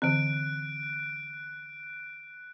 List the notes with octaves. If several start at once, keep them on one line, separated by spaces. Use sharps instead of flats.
D3 E3 C4 F#6 D7